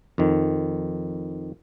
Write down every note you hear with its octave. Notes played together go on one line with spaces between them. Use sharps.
F2 D#3